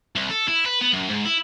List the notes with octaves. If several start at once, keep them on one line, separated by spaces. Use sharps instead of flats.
C2
A4
E4
B4
B3
F#2
G#2
E4